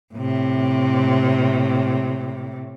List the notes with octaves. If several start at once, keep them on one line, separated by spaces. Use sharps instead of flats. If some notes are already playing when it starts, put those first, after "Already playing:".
A2 C3